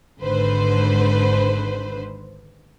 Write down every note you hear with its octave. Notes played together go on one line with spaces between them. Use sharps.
G#1 G#2 D3 B4 C5